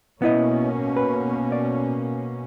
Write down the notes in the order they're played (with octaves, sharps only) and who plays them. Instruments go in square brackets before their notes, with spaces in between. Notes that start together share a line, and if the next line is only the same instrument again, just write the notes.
[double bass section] B2 A#3 C#4 [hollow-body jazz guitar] B3 E4 D#5
[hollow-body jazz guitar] B4
D5